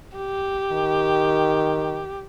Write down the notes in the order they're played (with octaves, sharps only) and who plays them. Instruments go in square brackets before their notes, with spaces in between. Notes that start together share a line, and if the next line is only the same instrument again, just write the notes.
[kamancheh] G4
[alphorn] D#3